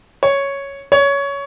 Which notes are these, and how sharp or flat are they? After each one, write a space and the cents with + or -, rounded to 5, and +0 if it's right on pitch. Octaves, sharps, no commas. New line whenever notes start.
C#5 +0
C#5 +15